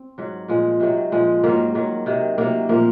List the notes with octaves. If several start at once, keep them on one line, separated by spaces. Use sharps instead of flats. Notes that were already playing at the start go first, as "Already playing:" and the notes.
Already playing: C4
G#2 F#3
A#2 F3 G#3
C3 D#3 F#3
A#2 F3 G#3
G#2 D#3 F#3 A#3
G#2 D#3 F#3
C3 D#3 F#3
C3 F#3 A#3
A#2 F3 A#3